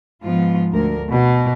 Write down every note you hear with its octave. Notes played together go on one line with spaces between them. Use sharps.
G#2 F3 B3 F4
D2 A#4
B2